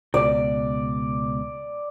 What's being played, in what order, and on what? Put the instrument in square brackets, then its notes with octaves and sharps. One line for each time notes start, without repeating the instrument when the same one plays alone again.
[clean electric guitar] C#2 B2 [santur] D5